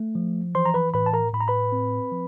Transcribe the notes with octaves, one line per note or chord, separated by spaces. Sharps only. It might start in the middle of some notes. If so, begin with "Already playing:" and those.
Already playing: A3
F3
E3 C5 C6
A#5
B4 B5
A2 B4 B5
A5
A#4 A#5
A2 B5
A#5
B4 B5
C4
F3